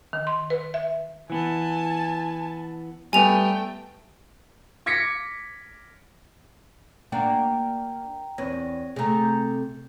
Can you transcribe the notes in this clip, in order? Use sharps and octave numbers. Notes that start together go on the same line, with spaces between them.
D#3
C6
B4
E5
E3 B3 G#5 A5
G3 A3 B3 G5 G#5 F7
D6 G#6 A#6 B6 C#7 D7
A#3 D4 F#4 G5 A#5
E2 C4 C#5 A#6
C3 A3 G#4 A#5
G6